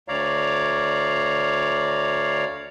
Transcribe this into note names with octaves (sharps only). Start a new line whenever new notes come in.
D2 C#5 D5 F5 A#5